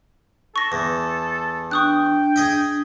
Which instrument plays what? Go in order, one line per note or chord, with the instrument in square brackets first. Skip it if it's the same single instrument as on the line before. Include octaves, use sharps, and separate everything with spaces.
[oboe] A4 [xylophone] C#6 A#6
[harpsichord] E2
[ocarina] D4 [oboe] G5 [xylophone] C#6 D#6 F#6
[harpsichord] G#4 D#5 E5